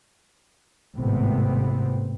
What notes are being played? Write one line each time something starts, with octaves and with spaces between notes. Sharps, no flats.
G#1 A2 C3 B3 C4